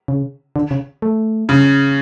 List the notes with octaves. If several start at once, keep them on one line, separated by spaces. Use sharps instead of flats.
C#3
D3
C#3
A3
C#3